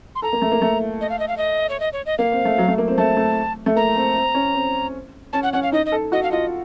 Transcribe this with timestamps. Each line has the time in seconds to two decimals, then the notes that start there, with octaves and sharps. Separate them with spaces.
0.15 C6
0.22 A4 A#5
0.33 A#3
0.42 A3
0.52 A#3
0.62 A3
1.01 D#5
1.10 F5
1.19 D#5
1.28 F5
1.37 D#5
1.69 C#5
1.80 D#5
1.93 C#5
2.06 D#5
2.18 A#3 F5
2.32 C4
2.45 A3
2.58 F#3
2.68 A3
2.78 A#3
2.88 C4
2.97 A3 A5
3.17 A3
3.66 A3
3.76 A#3 A#5
3.96 C4
4.16 C4
4.34 C#4
4.54 C4
5.33 C#4 A5
5.43 F#5
5.53 C#4 F#5
5.63 F5
5.72 D#4 D#5
5.86 D#5
5.92 A4
6.12 F#4 D#5
6.23 F5
6.32 F4 D#5